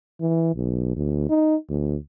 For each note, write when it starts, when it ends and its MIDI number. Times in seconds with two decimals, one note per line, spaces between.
0.21 0.53 52
0.56 0.92 35
0.96 1.28 38
1.29 1.56 63
1.69 1.96 38